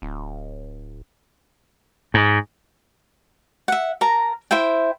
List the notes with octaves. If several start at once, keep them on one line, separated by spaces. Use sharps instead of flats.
D1
G#2
E5 F#5
A#4 A5 A#5
E4 C5 E5 G5